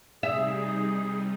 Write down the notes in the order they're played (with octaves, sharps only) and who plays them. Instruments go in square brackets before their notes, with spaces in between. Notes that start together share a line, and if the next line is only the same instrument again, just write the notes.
[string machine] C3 G3 D#4 [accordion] G#4 [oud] E5